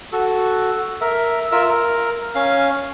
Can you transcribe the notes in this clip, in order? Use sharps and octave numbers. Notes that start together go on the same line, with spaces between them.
F#4 A4
A#4 E5
F4 A#4 E5 E6
A#4
C#4 F5